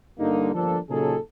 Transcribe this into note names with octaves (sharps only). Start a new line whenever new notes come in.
G2 D3 A#3 D#4
G1 F3 A#3 D4 A4
A#2 C#3 F#3 D#4 G#4 A4